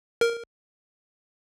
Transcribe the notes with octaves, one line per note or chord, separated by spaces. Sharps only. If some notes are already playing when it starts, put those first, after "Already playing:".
A#4